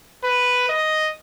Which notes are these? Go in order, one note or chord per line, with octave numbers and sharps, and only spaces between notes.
B4
D#5